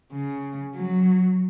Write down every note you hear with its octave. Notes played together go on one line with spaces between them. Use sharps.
C#3
F#3